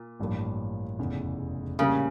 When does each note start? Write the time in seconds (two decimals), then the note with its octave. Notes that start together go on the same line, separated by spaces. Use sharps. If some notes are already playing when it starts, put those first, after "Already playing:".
Already playing: A#2
0.19 A1 G2 F3 A#3
0.99 F1 E2 C#3
1.79 A2 C#3 G3 A#3 C#4